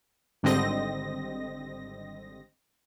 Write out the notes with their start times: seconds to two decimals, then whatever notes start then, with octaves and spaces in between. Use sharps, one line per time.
0.43 G#1 D3 G3 C4 D#5 A#6